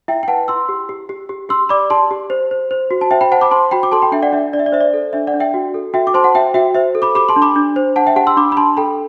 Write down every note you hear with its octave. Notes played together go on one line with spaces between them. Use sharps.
E4 E5 G5
G5
B4 F#5 A5
E4 C6 E6
G4
G4
G4
G4
G4 C6 E6
D5 B5 D6
G4 A5 C6
G4
C5
C5
C5
F#4
A5
C5 E5 G5
G5 B5
C5 F#5 A5
B5 D6
C5 A5 C6
F#4 G5 B5
D6
A4 A5 C6
G5 B5
D4 E5 G5
D5 F#5
D4 E5
D4 D5
E5
D5
C5 E5
D5
A4
D4 E5
D5 F#5
D4
E5 G5
F#4
A4
F#4 E5 G5
D6
C5 A5 C6
F#5 A5
F#4 E5 G5
F#4 E5 G5
C5 E5
A4
B5 D6
G4 B5 D6
A5 C6
D4
B5 D6
D4
C5
D4 F#5 A5
E5 G5
G4 F#5 A5
C6 E6
D4 B5 D6
B5
D4 A5 C6
A4 G5 B5